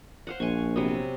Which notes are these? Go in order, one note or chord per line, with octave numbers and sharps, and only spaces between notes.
C5 F5 F#5
A#1 G#5 C#6
C3 F#3 B3